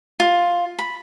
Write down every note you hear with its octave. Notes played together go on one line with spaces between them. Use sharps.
F4
B5